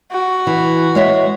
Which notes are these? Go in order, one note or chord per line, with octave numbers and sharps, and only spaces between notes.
F#4
E3
G#3 C#5 E5